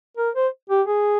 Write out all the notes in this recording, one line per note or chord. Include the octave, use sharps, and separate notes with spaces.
A#4
C5
G4
G#4